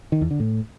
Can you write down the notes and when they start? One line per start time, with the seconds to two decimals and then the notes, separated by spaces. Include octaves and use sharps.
0.12 D#3
0.21 E2
0.31 D3
0.40 A2